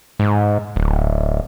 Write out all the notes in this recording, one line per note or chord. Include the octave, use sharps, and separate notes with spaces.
G#2
D1